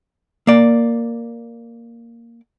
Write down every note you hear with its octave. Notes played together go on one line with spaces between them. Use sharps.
A#3 D5